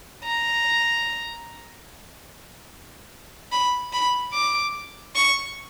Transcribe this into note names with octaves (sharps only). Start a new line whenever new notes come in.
A#5
B5
B5
D6
C#6